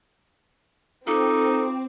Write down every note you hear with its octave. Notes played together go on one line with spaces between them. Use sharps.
C4 D#4 F4 A4 D6